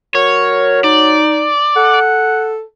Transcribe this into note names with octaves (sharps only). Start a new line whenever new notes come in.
F#3 A#4 C#5
D#4 D5
A4 F#5